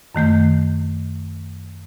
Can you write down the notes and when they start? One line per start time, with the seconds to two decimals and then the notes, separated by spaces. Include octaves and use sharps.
0.15 F#2 D#3 A3 G6